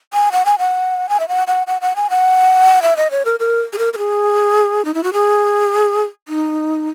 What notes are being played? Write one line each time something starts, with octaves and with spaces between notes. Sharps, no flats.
G#5
F#5
G#5
F#5
G#5
E5
F#5
F#5
F#5
F#5
G#5
F#5
E5
D#5
C#5
A#4
A#4
G#4
A#4
A#4
G#4
D#4
E4
F#4
G#4
D#4